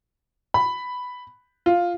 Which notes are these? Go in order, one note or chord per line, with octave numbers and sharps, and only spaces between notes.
B5
F4